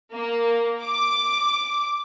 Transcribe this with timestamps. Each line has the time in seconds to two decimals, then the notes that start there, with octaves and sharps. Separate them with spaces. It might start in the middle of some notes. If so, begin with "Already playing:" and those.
0.12 A#3
0.84 D6